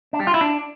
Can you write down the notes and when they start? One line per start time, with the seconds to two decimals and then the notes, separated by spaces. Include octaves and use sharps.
0.13 D4
0.20 G3
0.27 F4
0.34 E4
0.41 D4